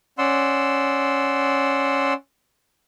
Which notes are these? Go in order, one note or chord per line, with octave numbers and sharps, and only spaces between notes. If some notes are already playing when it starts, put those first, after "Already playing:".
C#4 D5 F#5 C6 E6